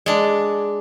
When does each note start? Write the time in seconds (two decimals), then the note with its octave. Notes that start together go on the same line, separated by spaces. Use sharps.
0.06 G#3 D4